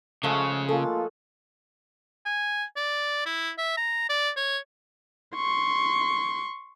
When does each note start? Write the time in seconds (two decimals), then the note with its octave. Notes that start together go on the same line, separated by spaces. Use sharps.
0.23 C#3 F3 G#3 A3
0.69 A#3 F4 A4
2.26 G#5
2.77 D5
3.26 E4
3.58 E5
3.77 A#5
4.09 D5
4.37 C#5
5.36 C6 C#6